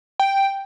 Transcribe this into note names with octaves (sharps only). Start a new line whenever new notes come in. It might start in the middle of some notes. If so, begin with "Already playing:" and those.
G5